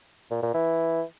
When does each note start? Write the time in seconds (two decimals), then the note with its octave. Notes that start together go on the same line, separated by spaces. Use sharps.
0.31 A#2
0.42 A#2
0.54 E3